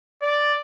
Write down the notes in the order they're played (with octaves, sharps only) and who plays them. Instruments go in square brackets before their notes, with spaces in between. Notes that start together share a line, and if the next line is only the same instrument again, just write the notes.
[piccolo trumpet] D5